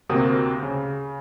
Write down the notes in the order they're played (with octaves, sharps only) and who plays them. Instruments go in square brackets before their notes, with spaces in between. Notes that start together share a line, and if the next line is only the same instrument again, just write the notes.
[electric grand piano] D2 C3 A#3 C4 F#4 D#6
C#3